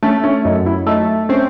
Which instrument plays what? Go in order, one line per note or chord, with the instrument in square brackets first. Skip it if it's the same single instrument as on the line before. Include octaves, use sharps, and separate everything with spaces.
[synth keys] A3 [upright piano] C#4
[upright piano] C#4
[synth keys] F#2 [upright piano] D#4
[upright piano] E4
[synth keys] A3 [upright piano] D#4
[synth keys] C4 [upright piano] C#4